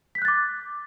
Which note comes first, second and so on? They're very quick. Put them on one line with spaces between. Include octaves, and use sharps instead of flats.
B6 G6 F#6 A6 D6